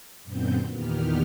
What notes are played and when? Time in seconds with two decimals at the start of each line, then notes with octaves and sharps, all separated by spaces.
0.23 F#2 A#2 D3 B3 C4 G6
0.72 E2 A#2 D#3 B3 G4 F6